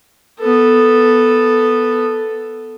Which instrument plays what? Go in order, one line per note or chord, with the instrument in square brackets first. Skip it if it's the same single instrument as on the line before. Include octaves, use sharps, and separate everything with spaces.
[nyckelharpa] B3 A4